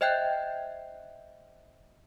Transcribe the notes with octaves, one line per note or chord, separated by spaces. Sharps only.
C5 D#5 E5 G5 F#6 G6